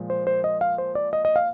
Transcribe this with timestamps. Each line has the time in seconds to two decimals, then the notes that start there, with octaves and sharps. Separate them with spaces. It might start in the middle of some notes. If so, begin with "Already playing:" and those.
Already playing: A#2 F3 G#3
0.10 C5
0.27 C5
0.44 D#5
0.61 F5
0.78 C5
0.95 D5
1.13 D#5
1.25 D#5
1.36 F5